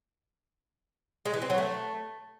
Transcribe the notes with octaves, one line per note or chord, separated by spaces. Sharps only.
G#3
E3
C4
F#3
A3